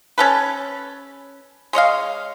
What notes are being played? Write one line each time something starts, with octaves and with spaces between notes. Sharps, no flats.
C#4 A4 B4
G#3 C#5 D#5 F5